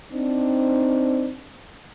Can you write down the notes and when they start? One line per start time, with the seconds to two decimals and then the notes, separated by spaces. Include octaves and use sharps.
0.12 C4 D4 D#4